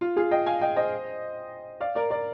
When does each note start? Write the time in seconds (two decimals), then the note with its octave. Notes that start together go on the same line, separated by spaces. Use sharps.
0.01 F4
0.16 F4 G#4
0.31 D#5 G5
0.46 F5 G#5
0.61 D#5 G5
0.76 C5 D#5
1.80 D5 F5
1.95 A#4 D5
2.10 A#4 D5